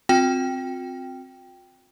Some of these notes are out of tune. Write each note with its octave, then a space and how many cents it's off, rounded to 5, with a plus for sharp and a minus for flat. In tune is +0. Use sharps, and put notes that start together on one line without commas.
C4 +0 F4 +45 G5 +0